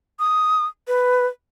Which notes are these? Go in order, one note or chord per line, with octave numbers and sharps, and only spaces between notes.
D#6
B4